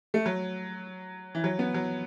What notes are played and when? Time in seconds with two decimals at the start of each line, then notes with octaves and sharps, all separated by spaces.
0.14 A3
0.26 F#3
1.35 E3
1.44 F#3
1.59 B3
1.74 F#3